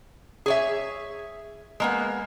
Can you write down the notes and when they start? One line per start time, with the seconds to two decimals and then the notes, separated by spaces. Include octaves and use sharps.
0.46 G#4 C#5 E5
1.80 G#3 A#3 B3